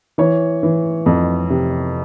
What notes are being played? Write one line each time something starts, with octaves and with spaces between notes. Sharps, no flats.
E3 C#5
E3
F2
C3